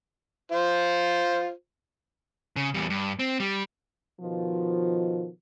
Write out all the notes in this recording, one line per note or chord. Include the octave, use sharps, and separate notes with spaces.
F4 C5
C#3
E2 G3
G2
C4
G3
B2 D#3 F3